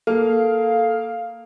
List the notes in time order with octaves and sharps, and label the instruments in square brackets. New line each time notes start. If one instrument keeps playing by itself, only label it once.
[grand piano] A#3 [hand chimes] A4 [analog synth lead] F5